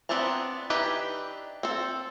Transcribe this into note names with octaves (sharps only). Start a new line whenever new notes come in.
B3 C4 D4 A5 A#5
E3 D4 D#4 G4 B4
C4 A4